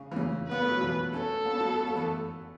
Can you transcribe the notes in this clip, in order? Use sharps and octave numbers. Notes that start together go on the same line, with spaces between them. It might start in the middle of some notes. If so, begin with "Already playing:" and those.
Already playing: C#3
E3
C#3
B3 B4
A3
F#3
B2 E3
A3 C#4 A4
B3
C#4
F#3 B3
A3
B3
E3 A3